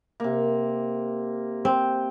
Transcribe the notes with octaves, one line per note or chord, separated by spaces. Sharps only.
C3 A#3
C4 G5